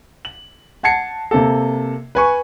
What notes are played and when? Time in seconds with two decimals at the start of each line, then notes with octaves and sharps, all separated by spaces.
0.25 F#7
0.83 F#5 A5 G#6 C7 C#7
1.31 C3 A#3 A4
2.15 B4 G#5 C#6